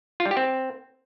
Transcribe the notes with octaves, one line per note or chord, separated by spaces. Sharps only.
F4
G3
G4
C4